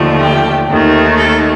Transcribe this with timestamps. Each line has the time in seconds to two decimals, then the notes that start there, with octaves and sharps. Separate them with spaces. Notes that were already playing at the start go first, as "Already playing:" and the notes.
Already playing: D#2 D3 F3 A3
0.20 G4
0.69 D#2 D#3 A3
1.18 A4